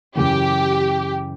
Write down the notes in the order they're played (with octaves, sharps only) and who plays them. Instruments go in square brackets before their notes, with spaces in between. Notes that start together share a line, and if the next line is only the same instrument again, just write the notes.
[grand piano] F#2 C#3 E3 [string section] G4